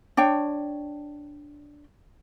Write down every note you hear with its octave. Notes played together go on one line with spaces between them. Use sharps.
D4 C#5 G5